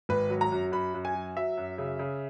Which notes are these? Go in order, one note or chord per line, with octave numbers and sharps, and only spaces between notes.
G#1 B4
F#3
A#5
F#2
F#2 B5
F#2
G#5
F#3
F#3 E5
F#2
C#3
C#3